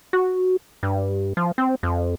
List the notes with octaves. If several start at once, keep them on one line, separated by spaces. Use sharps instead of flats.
F#4
G2
F3
C4
F2